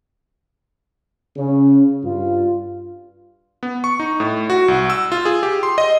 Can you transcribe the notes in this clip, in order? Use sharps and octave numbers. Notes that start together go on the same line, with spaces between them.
C#3 C#4
G2 F4
B3
C#6
D#4
A2
F#4
C2
E6
F4
G#4
G4
C6
D#5